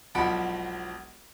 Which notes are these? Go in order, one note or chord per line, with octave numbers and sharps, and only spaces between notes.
E1 B1 F3 F#5 B5 D7